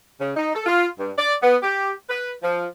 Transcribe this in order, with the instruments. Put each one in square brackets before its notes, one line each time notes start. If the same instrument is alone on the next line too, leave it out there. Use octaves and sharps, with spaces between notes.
[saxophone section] C#3
D#4
A4
F4
G2
D5
B3
G4
B4
F3